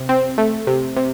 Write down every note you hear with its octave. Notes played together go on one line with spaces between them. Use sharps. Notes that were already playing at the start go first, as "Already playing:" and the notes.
Already playing: C3
C4
A3
C3
C3